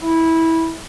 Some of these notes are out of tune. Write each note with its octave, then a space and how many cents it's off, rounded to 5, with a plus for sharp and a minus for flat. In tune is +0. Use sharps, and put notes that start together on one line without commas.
E4 -15